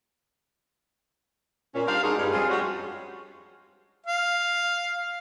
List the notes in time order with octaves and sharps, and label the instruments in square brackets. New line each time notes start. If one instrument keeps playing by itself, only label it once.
[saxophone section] A#2 C#4
G3 D4 A#4 C5 F5
D4 D#4 F4 F#4 G#4
G2 G#3
F2 G3 C4 F4 G#4 F5
G3 G#3 C#4 F#4
[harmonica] F5